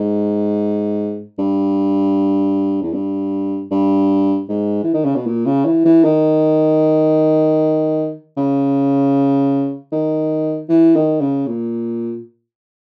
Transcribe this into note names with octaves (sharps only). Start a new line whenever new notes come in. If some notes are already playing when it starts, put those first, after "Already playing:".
Already playing: G#2
G2
E2
G2
G2
G#2
E3
D#3
C#3
B2
A#2
C#3
E3
E3
D#3
C#3
D#3
E3
D#3
C#3
A#2